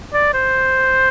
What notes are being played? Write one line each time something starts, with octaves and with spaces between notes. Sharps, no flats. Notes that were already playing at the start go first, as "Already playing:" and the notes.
D5
C5